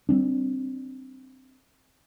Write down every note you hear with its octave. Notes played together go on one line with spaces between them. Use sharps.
G3 C4 D4